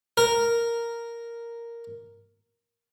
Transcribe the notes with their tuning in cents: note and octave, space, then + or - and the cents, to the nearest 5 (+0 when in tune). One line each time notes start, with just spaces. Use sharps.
A#4 +0